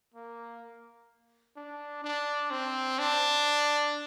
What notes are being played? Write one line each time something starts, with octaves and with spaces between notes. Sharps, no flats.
A#3
D4
D4
C4
D4